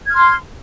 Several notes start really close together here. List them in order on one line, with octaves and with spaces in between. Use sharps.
G#6 F6 C6